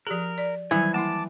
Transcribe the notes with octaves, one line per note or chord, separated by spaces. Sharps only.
F3 G4 G#4 A#4
D5
D#3 E3 F#3 G3 G#5
A#3 E4 A5 D6